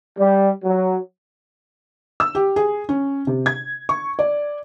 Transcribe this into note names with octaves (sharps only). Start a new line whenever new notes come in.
G3
F#3
E6
G4
G#4
C#4
C3
G#6
C#6
D5